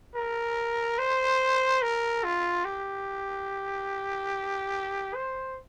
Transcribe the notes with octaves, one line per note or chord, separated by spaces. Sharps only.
A#4
C5
A#4
F4
G4
C5